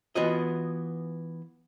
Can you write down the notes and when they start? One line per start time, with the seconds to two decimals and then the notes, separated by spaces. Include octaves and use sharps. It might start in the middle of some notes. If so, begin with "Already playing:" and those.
0.15 E3 B3 F4 F#4 D#5